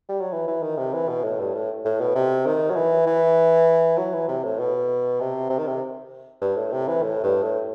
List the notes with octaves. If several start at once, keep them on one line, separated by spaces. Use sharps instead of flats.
G3
F#3
E3
E3
D#3
C3
E3
B2
A2
G2
A2
A2
B2
C3
D#3
F#3
E3
E3
F#3
E3
C3
A2
B2
C3
C3
D#3
C3
G2
A2
C3
E3
A2
G2
A2